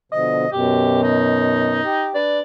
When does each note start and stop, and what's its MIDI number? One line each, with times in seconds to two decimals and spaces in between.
0.12 0.45 47
0.12 0.45 50
0.12 0.45 53
0.12 0.48 75
0.53 1.81 42
0.53 1.81 47
0.53 1.01 67
1.03 2.07 63
1.84 2.13 67
2.15 2.40 62
2.15 2.40 71
2.15 2.41 74